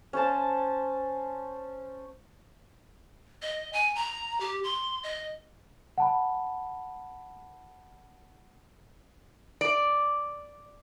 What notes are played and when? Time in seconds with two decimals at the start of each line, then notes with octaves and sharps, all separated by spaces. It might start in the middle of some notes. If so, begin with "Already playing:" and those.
0.13 C#4 C5 A5
3.42 D#5
3.73 G#5
3.95 A#5
4.40 G4
4.64 C6
5.03 D#5
5.98 F#5 A5 B5
9.61 D5